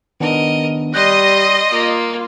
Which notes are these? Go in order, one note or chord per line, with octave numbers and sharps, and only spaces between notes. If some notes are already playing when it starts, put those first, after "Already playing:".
D#3 B3 D4 A#4 D#5
G3 D#5 C6 D#6 F#6 G6
A#3 F4